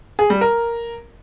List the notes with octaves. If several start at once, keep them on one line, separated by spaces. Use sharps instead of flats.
G#4
G3
A#4